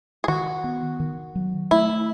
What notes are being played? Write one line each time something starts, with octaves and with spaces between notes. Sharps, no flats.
G#4
D#3 F#4
B3
D#3
F#3
A3 E4